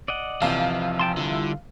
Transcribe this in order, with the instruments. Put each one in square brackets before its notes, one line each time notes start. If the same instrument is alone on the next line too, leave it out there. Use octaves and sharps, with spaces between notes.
[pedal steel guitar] D5 D#5 F#5
[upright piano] A#1 E2 C3 [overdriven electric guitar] F3 [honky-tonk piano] F5
[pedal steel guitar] G5 A5 C6
[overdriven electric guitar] D3 [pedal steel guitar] G3 E4 F4